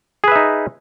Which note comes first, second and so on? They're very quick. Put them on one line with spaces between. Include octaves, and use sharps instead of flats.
G#4 B4 E5 D#4